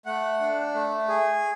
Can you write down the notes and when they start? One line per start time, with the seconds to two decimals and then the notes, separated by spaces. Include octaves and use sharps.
0.06 A3 F#5
0.40 D4
0.74 A3
1.08 G#4